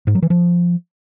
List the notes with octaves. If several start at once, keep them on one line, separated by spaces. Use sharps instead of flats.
G#2
F#3
E3
F3